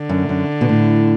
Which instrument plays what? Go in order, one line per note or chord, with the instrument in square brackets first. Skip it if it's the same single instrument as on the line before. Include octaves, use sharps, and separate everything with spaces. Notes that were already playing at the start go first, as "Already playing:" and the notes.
Already playing: [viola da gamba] D3
[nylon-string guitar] F#2
F#2
B2
A2